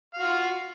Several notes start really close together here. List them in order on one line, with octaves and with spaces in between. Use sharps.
F5 F#4 F4